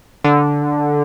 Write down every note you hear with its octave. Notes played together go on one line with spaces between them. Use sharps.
D3